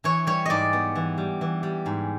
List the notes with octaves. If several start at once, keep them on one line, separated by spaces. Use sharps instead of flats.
E3 C#5
G3 C#5
G#2 D5 D#5
B3
E3
G3
E3
G3
G#2